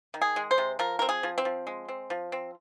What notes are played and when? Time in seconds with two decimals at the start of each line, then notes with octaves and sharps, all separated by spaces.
0.14 D#3
0.21 G#4
0.36 G#3
0.51 C5
0.58 C3
0.79 F3 A#4
0.99 C4 A#4
1.09 G#4
1.23 F3
1.38 C4
1.45 F3
1.67 G#3
1.88 C4
2.10 F3
2.32 C4